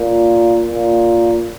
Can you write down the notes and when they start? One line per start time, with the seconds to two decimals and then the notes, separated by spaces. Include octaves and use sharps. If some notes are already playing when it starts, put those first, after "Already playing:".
Already playing: A#2
0.68 A#2